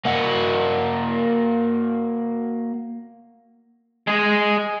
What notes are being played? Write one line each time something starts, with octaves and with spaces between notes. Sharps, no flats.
A#3 F#4
G#3 G#4